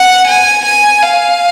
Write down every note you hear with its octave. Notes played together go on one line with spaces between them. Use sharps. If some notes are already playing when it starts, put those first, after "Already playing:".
Already playing: F#5
G#5
G#5
F5